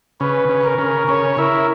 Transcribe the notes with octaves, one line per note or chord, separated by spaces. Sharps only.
C#3 B4
C#3
A#4
C#3
C#3 C#5
E4 A#4